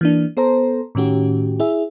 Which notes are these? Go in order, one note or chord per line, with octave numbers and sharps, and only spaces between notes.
E3 A#3 D4
B3 A4 C5 A#5
A2 D#3 C#4 F#4 G4
E4 G#4 E5